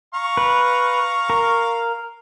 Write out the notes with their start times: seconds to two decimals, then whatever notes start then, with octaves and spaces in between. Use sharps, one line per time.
0.14 F5 A#5 C#6
0.37 B4
1.30 A#4